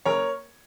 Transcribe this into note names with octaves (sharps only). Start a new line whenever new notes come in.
F#1 A#4 C#5